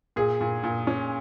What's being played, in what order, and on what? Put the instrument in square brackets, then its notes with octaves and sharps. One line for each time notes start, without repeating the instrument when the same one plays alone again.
[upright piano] A#2 [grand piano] G#4
[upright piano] A#2
A#2
C#4